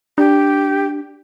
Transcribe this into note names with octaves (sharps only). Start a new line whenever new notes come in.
D4 G4